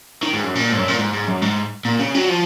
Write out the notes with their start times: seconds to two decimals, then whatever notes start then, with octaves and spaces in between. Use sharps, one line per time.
0.23 D#3
0.33 G#2
0.44 F#2
0.55 A#2
0.72 G#2
0.77 F#2
0.88 A#2
0.99 G#2
1.14 G#2
1.28 F#2
1.42 G#2
1.85 A#2
1.99 C#3
2.15 F#3
2.28 F3